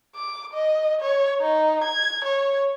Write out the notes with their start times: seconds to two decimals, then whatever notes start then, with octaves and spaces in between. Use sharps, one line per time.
0.15 D6
0.53 D#5
1.01 C#5
1.41 D#4
1.84 G#6
2.25 C#5